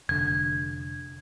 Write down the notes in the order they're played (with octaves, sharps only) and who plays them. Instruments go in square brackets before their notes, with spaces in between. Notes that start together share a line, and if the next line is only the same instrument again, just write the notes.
[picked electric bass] F1 D3 [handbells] G#6